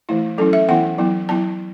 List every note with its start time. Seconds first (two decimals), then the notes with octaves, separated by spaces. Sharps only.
0.09 E3 A3 E4
0.38 F#3 C#4 E4 A4
0.53 E5
0.69 E3 B3 E4 F#5
0.98 F#3 B3 E4
1.29 F#3 B3 E4 A5